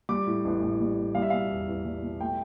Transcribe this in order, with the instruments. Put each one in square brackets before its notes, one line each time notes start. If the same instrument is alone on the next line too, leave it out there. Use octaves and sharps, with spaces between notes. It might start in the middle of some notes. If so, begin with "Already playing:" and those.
[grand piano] G3 D6
A2
A1
A1
G3
A2
G3 F5
E5
B2 F5
E2
E2
G3
B2
A3 G5